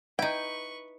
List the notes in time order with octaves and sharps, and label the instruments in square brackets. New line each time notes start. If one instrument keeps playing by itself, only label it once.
[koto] D#4 E4 [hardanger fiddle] B4 C#6 [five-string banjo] G5